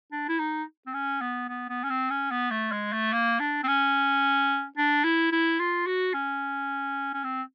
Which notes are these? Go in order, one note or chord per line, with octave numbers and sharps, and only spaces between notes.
D4
E4
D#4
C4
C#4
B3
B3
B3
C#4
C4
C#4
B3
A3
G#3
A3
A#3
D4
C4
C#4
D4
E4
E4
F4
F#4
C#4
C#4
C4